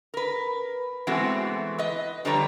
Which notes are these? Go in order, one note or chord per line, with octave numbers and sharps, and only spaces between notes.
A#4 B4
E3 G#3 A3 B3 C4 F#4
B4 D#5
D3 F3 G3 B4 C#5 A#5